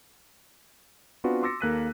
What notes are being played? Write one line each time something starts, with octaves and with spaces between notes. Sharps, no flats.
B3 C4 D4 F4 F#4 B4
C6 D6 E6 A6 A#6 C#7
D#2 A#3 A4 F#6 B6 D#7